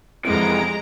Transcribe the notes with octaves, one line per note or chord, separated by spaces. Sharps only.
F2 C3 E3 G#3 A#5 D7